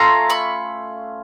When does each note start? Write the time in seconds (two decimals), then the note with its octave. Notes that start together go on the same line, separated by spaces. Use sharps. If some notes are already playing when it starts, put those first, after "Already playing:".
Already playing: A3 C#4 F4 A#5 C6
0.30 B5 C#6